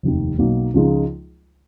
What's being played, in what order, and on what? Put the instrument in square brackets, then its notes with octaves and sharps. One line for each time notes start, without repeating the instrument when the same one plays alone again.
[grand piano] F1 D#2 D#3
B1 B2 F#3 A#3 D#4
C#2 C#3 F3 G#3 D#4